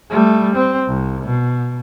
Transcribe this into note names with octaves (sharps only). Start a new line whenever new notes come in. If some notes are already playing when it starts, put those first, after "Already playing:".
G3 A3
C4
C2
B2